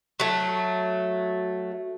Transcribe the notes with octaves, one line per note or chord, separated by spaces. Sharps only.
F#3 A3